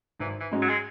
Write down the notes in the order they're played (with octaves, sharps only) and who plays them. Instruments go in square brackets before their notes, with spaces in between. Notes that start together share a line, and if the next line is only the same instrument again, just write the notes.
[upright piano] G#1 [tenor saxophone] E3
[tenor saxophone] E3
[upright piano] G#2 G#3 C#4 F#4
[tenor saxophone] F#3
G#3